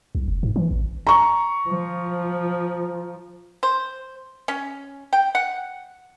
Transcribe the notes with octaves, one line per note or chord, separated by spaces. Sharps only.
C2
F1
G#2
E3
A1
A#5 C#6
F3
C5
C#4
G5
F#5